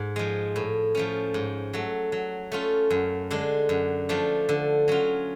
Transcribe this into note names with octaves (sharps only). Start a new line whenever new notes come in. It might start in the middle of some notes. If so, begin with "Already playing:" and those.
Already playing: G#2
F3 G#3
A2
F3 A3 C#4
G#2
F#3 A3
F#3
A3 C#4 F4
F#2
D3 G#3 D4
F#2
F3 A3 D4
D3
F#3 C#4 F4